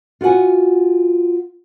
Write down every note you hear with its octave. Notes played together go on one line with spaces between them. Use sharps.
F4 F#4 C#5 F#5 G#5